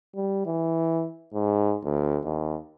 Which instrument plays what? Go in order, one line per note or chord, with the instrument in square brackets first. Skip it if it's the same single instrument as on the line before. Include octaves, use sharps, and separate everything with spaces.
[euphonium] G3
E3
G#2
D2
D#2